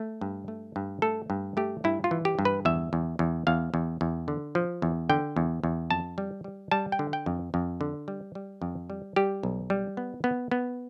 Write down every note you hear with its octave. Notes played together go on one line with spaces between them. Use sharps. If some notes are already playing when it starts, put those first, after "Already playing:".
Already playing: A3
G2
A3
G2
A3 A4
G2
A3 G4
G2 E4
F4
E3
G4
G2
B4
E2 E5
E2
E2
E2 F5
E2
E2
D3
F3
E2
D3 G5
E2
E2
F2 A5
G3
G3
G3 A5
G5
D3
G5
F2
F2
D3
G3
G3
F2
G3
G3 G4
B1
G3
B3
B3
B3